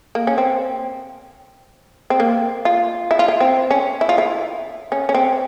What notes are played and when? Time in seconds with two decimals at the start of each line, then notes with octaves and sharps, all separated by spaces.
0.15 A#3
0.27 C#4
0.38 C4
2.10 C4
2.20 A#3
2.65 F4
3.11 E4
3.19 F4
3.28 E4
3.40 C4
3.71 C#4
4.01 E4
4.09 F4
4.18 E4
4.92 C#4
5.09 C#4
5.14 C4